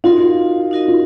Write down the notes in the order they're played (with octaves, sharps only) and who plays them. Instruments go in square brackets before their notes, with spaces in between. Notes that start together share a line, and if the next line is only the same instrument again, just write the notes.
[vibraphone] D#4 F#4 A#4 D#5 [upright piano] F4
[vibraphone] D#4 F#4 A#4 D#5
[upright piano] F4